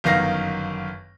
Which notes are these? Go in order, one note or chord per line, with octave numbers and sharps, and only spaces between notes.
G1 F#2 D#3 F5 A#6